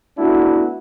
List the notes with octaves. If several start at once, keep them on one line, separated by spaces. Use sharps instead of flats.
A3 B3 D4 E4 F#4